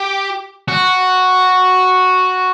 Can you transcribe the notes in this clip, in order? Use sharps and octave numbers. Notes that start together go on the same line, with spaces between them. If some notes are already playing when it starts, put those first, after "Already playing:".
Already playing: G4
F#4